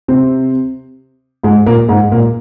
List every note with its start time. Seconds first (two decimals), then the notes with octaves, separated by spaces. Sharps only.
0.08 C3 C4
1.44 G#2 G#3
1.67 A#2 A#3
1.88 G#2 G#3
2.12 A#2 A#3